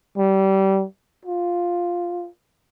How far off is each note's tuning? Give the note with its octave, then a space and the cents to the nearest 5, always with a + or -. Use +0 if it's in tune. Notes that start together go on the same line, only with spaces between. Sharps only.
G3 -25
F4 +5